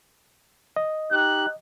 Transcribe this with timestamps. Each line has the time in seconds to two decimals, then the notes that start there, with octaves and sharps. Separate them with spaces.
0.76 D#5
1.12 D#4 G4 F#6